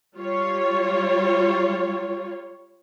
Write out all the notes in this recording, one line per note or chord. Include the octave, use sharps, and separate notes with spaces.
G3 F4 C#5